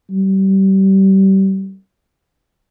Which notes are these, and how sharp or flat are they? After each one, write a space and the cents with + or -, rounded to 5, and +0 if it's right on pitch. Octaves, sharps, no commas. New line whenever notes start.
G3 -30